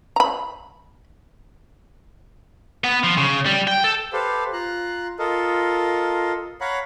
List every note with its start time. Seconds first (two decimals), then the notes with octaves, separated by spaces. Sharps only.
0.16 A#5 B5
2.84 B3
3.04 F3
3.18 C#3
3.46 G3
3.67 G5
3.84 A4
4.13 G4 A4 B4 C5 F5
4.53 F4 A#5 F#6
5.19 F4 A4 A#4 D#5
6.61 C#5 F5 F#5 A#5 B5